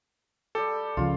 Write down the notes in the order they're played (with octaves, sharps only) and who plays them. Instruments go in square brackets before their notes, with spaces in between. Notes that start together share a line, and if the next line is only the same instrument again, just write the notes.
[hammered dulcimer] G3 G4 [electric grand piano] A4
[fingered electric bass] C#2 C#3 F3 [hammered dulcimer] F4